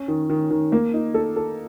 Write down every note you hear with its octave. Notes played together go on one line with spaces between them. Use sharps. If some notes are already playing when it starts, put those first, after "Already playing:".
Already playing: C#4
D#3
D#3
D#3
A#3
D#4
A4
A4